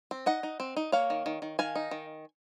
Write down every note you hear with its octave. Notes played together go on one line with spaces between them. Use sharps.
C4
D#4 D#5 F#5
D#4
C4
D#4
A#3 C#5 F5
D#3
D#3
D#3
D#3 F5 G#5
D#4
D#3